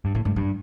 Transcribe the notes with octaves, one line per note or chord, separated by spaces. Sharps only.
G2
A2 A#3
G2 A3
G2 G3